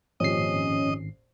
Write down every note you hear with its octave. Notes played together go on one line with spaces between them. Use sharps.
G#1 F2 A#2 C#4 G4 D#5 C7